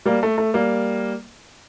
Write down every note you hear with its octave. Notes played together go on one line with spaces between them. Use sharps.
G3 A#3
A3
A3
G3 A#3